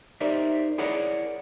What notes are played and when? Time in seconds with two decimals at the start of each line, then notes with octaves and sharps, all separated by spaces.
0.20 D#4 G4 A#4 C5 D5 E5
0.78 E4 G#4 A#4 C#5 D5 F#5